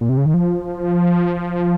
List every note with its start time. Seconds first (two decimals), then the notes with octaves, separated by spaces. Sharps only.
0.01 A#2
0.09 C3
0.17 C#3
0.26 D#3
0.34 F3